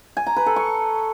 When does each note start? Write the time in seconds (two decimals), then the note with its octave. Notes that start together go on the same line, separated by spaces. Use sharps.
0.17 G#5
0.27 A#5
0.36 B4
0.46 A4
0.56 C#6